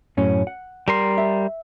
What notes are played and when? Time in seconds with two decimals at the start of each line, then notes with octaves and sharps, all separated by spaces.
0.17 F#2 A2 C#4
0.47 F#5
0.88 G3 A#4 C6
1.18 E5